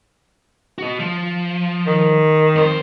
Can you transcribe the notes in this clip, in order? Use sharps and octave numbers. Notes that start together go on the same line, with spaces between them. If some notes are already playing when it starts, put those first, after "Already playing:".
F#4 D#5
F3
D#3
F2 C5